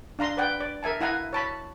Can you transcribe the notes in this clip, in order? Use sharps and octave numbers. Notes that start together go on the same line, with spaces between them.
D4 F5 A#5 C6
B4 D5 F#5 G5
D5
A#4 E5 G#5 A5
E4 F5 F#5 G#5 A#5
C#5 A5 B5